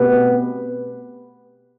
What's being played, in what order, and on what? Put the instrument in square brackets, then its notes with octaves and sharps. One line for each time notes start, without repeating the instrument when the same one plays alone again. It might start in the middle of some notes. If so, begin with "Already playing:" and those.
Already playing: [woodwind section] B2 A3 C4 G4 B4 [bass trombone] B3